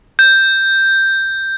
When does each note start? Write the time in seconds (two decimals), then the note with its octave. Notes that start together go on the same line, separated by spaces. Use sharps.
0.19 G6